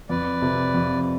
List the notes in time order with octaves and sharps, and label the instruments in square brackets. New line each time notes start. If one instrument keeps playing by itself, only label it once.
[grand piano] F2 [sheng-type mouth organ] B4 D5
[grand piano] C3
F2